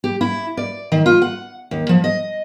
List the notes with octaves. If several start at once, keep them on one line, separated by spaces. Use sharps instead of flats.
G4
E4
D5
D#3
F4
F#5
D#2
F3
D#5